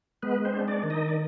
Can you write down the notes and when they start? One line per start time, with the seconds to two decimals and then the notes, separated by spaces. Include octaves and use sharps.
0.22 G#3 B3 B4
0.45 C4 C5
0.53 D4
0.68 D4 D5
0.83 D#3
0.90 D#4 D#5
1.08 D5